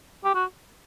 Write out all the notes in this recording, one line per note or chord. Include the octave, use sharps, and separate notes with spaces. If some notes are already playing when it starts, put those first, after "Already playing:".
G4
F#4